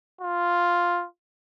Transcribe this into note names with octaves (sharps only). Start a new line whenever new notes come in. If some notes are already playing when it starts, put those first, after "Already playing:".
F4